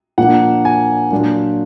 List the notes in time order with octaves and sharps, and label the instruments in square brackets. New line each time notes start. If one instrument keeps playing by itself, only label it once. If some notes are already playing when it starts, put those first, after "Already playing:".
[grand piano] A#2 F3 A#3 D4 F#5
G#5
A#2 F#3 D4 F4